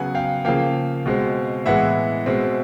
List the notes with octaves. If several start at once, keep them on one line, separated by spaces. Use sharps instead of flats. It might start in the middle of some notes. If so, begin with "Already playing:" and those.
Already playing: C#3 F#3 B3 F#5 G#5
F5 G5
C#3 F3 A#3 F5 G5
B2 G#3 C4
A2 E3 G#3 B3 E5 F#5
B2 G#3 C4